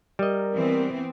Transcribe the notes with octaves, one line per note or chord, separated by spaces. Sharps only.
G3 A#4 D#5
E3 B3 C4